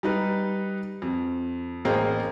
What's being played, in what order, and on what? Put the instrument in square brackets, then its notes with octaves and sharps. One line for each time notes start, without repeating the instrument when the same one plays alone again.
[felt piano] G3 D#4 B4
F2
A1 A#3 G#4 C5 G5